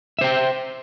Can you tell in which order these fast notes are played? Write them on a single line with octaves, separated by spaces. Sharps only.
E5 C5 G5